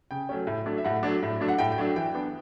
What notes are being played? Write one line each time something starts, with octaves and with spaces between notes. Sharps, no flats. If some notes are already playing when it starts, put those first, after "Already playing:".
C#3 G5
F#3 A3 C#4
A2
F#3 A3 D4
E5
A2 F#5
F#3 A3 D4
A2
F#3 A3 D4
F#5
A2 G5
G5
F#3 A3 D4
E3 G5
B3 D4